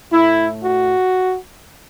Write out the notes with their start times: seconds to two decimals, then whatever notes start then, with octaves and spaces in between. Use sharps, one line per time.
0.12 A2 A3 E4
0.63 F#4